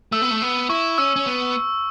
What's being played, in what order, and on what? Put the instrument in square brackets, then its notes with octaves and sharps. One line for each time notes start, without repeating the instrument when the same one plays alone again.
[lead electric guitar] A3 [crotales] E6
[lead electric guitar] B3
A3
[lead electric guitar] B3 [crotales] E6
[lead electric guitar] E4 [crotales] C#6
[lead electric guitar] C#4 [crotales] E6
[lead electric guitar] C#4
B3